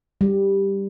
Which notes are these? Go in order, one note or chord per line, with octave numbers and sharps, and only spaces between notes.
G3